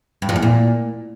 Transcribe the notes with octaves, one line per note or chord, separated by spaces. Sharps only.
G2
F2
E2
A#2